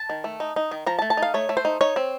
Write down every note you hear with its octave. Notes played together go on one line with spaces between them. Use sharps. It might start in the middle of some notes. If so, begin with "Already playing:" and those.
Already playing: A5
D#3
A3
D#4
D#4
D#3
F3 A#5
A5
A3
A5
D#4
F5
A3 C#5
A3
C5
D#4
D#4 C#5
C4